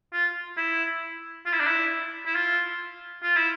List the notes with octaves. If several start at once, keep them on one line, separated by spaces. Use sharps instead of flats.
F4
E4
F4
E4
D4
E4
E4
F4
F4
E4